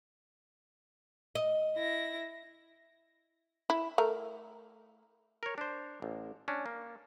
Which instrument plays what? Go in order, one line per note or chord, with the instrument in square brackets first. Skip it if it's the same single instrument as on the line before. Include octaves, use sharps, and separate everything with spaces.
[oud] D#5
[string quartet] E4 A#6
[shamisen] E4
A3 A#4
[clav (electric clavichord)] A#4 C#5
D4 C5
A1
C#4 D4
A#3